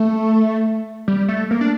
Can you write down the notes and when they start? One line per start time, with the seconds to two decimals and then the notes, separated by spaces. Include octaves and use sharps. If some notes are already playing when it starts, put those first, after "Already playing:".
Already playing: A3
1.08 G3
1.28 A3
1.51 A#3
1.61 D4